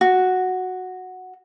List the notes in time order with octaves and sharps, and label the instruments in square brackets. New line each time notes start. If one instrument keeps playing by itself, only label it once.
[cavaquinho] F#4